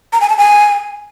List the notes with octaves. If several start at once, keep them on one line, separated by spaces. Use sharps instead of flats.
A#5
G#5
A5
G#5